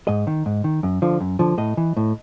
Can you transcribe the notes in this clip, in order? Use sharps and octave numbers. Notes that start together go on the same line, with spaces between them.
G#2 D#5
D#3
G#2
D#3
F#2
D3 F3
F#2
D3 F3
A2 D#5
E3
A2